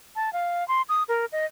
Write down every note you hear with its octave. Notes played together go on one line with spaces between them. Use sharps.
A5
F5
C6
D#6
A#4
D#5